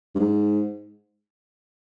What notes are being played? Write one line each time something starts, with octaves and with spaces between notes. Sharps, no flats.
G2
G#2